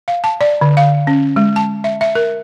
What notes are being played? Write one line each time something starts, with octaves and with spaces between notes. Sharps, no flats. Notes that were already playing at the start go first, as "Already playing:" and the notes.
F5
A5
D5
D3
F5
C#4
G#3
A5
E5
E5
A#4